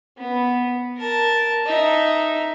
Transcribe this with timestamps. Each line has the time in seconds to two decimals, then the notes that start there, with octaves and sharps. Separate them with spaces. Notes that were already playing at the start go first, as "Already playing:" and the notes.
0.18 B3
0.97 A#4 A5
1.66 D#4 E5